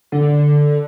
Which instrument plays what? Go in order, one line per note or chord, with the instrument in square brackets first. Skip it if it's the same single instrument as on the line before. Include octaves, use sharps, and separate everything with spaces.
[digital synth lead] D3